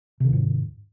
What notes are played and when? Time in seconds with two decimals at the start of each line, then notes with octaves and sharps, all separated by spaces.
0.20 C3
0.25 D#3
0.29 E2
0.33 G#2